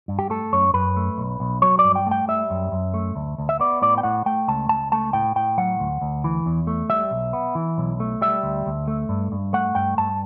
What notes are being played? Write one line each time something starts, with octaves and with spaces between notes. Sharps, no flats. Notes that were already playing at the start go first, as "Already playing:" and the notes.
G2
G4
A3 A4
F#2 C#5
F#2 B4
A3
B1
B1
F#3 C#5
D5
G2
G5
A3 G5
G3 E5
F#2
F#2
A3
D2
D2
E5
B3 D5
A2 D5
G5
A2 F#5
A3 G5
C#2 A5
C#2 A5
A3 A5
A2 G5
A2 G5
F#3 F#5
D2
D2
E3
E2
A3
G3 E5
B1
B3
E3
B1
A3
G3 E5
D2
D2
A3
G2
G2
A3 F#5
G2 G5
G2 A5